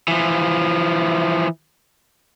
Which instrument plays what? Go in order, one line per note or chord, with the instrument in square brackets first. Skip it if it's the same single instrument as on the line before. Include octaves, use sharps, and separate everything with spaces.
[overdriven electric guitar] E3 F3